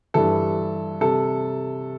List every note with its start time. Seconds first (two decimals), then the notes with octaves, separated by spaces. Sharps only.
0.14 G2 E3 G3 A4
1.01 C3 G3 A4